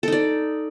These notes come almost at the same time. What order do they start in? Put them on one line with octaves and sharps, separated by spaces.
A4 D#4 D5